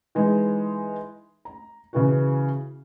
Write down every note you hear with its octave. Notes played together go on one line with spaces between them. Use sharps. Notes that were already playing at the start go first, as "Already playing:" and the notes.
E3 G#3 D#4
A#5
C#3 E3 F#4